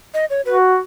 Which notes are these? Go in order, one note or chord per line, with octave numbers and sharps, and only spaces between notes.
D#5
C#5
F#4 B4